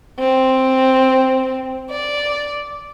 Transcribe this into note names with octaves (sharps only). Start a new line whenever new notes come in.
C4
D5